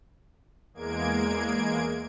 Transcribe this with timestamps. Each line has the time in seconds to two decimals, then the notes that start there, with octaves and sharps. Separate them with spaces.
0.74 E2 G#3 A#3 G#6 D7